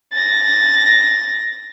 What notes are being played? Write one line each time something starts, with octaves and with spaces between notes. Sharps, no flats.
A6 A#6